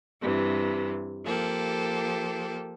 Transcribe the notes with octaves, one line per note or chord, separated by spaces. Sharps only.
G2 C3 E3
F3 A#3 G4 A4